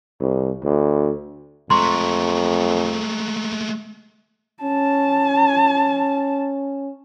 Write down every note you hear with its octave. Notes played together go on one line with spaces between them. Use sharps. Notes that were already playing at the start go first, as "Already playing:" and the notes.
C2
D2
F2 G#3 A3 A#5 C6 C#6
C#4 A5